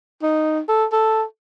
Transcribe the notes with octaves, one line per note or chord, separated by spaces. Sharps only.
D#4
A4
A4